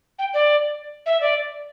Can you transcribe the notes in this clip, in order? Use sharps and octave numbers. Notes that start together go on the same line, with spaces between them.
G5
D5
E5
D5